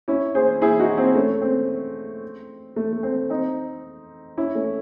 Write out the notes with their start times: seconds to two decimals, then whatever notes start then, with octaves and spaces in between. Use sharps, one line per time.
0.08 C#4 E4
0.35 G#4 C5
0.62 E4 G#4
0.79 D#4 F#4
0.97 C4
1.15 A3 C#4
1.42 C4
2.76 A3
2.93 A3
3.03 C4
3.30 C4 D#4
4.37 C#4 E4
4.55 A3 C#4